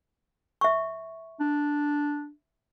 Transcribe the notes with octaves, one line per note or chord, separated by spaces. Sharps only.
E5 C#6
D4